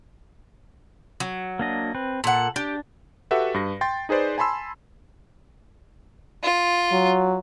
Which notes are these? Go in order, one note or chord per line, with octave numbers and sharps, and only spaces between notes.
F#3
A#3 D4 D#5
C4 B4
A#2 A4 F#5
D4 G4
F#4 G4 A4 B4 E5 F#5
G2 B4 A#6
G5 C6 A6
D#4 G#4 B4 C5 D5
G#5 A5 B5 C6 E6
F4
F#3